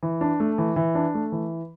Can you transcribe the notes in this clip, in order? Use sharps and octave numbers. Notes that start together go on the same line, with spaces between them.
E3
D4
A3
E3
E3
D4
A3
E3